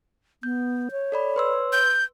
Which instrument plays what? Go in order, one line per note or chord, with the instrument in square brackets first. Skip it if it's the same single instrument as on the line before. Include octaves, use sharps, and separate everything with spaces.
[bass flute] B3 [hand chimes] G6
[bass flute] C#5
[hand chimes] A4 D5 B5
B4 C6 E6
[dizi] G6